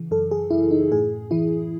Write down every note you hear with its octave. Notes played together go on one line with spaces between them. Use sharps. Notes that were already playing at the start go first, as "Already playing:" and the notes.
Already playing: C#3 E3
F#2 A4
G#4
F#2 E4
D#4
A2 G#4
E3 E4